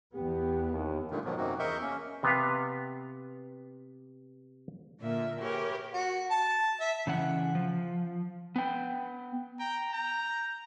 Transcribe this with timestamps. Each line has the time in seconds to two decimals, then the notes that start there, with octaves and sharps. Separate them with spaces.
0.15 E2 B3 G4
0.71 D#2
1.10 G2 A#2 D3 D#3 A3
1.25 G#2 B2 D#3 F3 F#3
1.37 F#2 C3 A#3 C4 D#4 F#4
1.59 E2 A#4 D#5 E5 C#6 G6
1.82 A#3 C#4
2.23 C3 B3 B4 F5
5.01 A#2 D3 A#3 E5
5.41 G4 G#4 A#4 B4 C#5
5.94 F#4
6.31 A5
6.81 E5
7.07 C#3 E3 F#5
7.55 F3
8.56 B3 G5
9.60 G5 A#5
9.93 A#5 G6